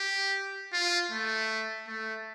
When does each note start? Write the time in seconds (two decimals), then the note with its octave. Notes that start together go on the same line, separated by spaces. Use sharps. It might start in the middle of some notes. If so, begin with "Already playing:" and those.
Already playing: G4
0.73 F4
1.11 A3
1.87 A3